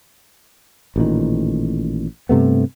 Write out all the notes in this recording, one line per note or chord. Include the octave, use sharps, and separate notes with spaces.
A1 A#2 D#3
G2 C3 A3 B3